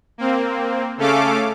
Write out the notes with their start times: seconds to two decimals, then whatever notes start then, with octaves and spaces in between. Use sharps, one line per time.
0.18 A#3 C4
0.97 C#3 A3 C#4 A4 F5 D6